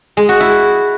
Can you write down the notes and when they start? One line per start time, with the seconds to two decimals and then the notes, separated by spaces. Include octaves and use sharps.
0.17 G#3
0.29 F#4
0.40 E4